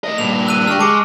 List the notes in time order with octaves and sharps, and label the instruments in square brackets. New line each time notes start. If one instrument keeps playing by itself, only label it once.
[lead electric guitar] A3 D#5
[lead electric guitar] G2 A#2 [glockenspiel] F7
[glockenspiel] E6 F#6 D#7
[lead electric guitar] D4 G4 [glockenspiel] C#6 F6
[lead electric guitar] G#3 [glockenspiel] A5 D6 C#7